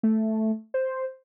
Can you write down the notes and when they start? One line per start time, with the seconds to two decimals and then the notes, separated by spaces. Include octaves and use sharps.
0.03 A3
0.74 C5